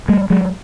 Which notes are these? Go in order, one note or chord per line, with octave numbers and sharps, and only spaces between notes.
G3 A3
F#3 G#3